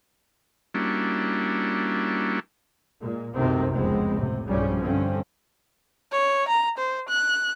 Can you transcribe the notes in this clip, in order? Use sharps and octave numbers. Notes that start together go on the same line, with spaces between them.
G3 A#3 C#4 D4 E4 F#4
A#2 G#3
C2 F#2 C3 D#3 A3 C4
F1 C#2 G#3 B3 C4
A2 C3
B1 G2 C#3 F3 G3 C#4
G2 D3 C4 C#4
C#5
A#5
C5
F#6